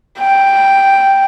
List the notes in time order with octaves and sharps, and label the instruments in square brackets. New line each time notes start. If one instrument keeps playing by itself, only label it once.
[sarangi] G5